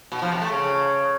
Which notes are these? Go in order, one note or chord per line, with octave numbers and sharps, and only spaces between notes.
B2
F3
C3
A3
C#3